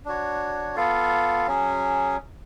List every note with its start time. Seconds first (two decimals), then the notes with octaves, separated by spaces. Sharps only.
0.05 D4 F#4 C#5
0.76 B3 F4 A4 F5
1.47 F#3 C#4 G#4